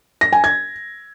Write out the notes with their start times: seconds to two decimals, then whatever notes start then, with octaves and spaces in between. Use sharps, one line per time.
0.21 A#6
0.33 G#5
0.44 G#6